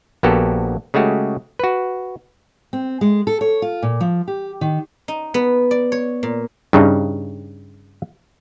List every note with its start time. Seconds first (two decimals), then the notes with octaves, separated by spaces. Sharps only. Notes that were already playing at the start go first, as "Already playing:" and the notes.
0.23 A#1 A#3 B3 F#4 G4 A4
0.94 C#3 G#3 A3 F#4 G4
1.59 F#4 B4
2.73 C4
3.01 G#3
3.27 A4
3.41 C#5
3.62 F4
3.83 A#2
4.01 F3
4.28 G4
4.61 D#3
5.08 D#4
5.34 B3
5.71 D5
5.92 C#5
6.23 A#2
6.73 G2 C#3 G3 D#4